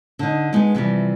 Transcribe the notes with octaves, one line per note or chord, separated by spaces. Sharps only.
D3 D#4
G#3 B3 D#4 G#4
C3 E3 F3 G3